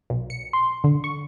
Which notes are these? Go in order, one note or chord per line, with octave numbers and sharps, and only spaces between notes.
B1
C#7
C6
D3
C#6